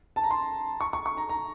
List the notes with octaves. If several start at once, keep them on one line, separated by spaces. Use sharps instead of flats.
A5
A#5
C6
C#6
C#6
C#6
A#5
A#5